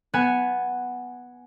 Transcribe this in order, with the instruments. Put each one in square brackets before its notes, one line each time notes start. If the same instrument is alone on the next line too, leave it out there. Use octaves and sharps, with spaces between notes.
[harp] B3 F#5 G#5